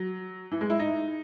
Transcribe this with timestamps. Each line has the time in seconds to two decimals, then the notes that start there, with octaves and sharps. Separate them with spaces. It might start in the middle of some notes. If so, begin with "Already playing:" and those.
Already playing: F#3
0.52 E3
0.61 G#3
0.70 E4
0.79 D#4